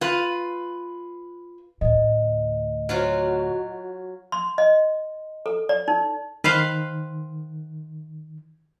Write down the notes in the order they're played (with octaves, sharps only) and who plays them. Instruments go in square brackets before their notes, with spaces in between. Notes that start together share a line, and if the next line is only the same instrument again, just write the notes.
[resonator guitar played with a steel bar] F4 B4
[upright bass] D2 A2 [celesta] D#5
[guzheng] F#3 F4 F#4
[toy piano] C6
D#5
A4
D5
D#4
[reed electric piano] D#3 [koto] B4 C5 F5